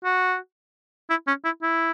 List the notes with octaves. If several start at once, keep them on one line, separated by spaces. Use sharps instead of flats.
F#4
E4
C#4
E4
E4